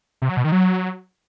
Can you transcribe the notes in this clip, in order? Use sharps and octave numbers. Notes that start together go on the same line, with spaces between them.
C3
F#3
B2
D#3
F#3